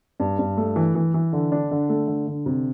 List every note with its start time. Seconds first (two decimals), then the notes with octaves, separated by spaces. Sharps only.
0.20 G2
0.39 G2
0.57 A3
0.76 E3
0.95 E3
1.14 E3
1.33 D3
1.52 D4
1.71 D3
1.89 A3
2.08 D3
2.27 D3
2.46 C3